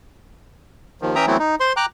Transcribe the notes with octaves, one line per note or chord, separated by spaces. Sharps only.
D#2 D#3 F3
E3 C#4 E5 G5 A#5 D#6
E3 F#3 A3 B3 C4 E4
D#4
C5 C6
G5 A#5 D6 F#6